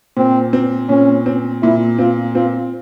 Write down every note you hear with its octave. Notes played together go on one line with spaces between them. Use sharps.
A#2 C4
C4
A#2 C#4
C4
A#2 E4
C4 F4
C4 F4